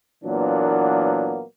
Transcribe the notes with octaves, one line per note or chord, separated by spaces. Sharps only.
A#2 E3 F#3 A#3 B3 D4